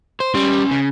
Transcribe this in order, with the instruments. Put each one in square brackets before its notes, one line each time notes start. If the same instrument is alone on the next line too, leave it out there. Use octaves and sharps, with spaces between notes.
[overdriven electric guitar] C5
[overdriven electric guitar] G3 [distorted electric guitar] C#4 C6
[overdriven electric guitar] C#3